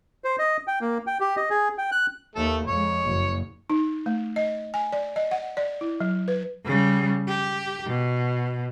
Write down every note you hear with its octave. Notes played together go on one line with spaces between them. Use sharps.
C5
D#5
G5
A#3
G5
G4
D#5
G#4
G5
F#6
D#2 A3 A4
F2 G#3 C#5
F#1
D#4
A3
D#5
G#5
D5
D#5
F#5
D5
E4
F#3
B4
C#3 G3
G4
B2